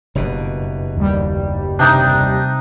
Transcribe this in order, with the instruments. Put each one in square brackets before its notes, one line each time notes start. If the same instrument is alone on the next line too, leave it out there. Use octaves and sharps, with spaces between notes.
[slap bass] F#1 G2 B2
[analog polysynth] D#2 G3
[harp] C3 G5 [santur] D4 D#4 D6